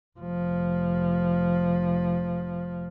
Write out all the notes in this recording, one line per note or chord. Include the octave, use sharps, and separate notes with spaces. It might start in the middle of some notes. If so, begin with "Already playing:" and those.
F1 F3